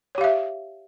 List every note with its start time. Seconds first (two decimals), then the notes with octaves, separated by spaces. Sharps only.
0.15 C#5
0.18 G4
0.21 F5
0.24 E5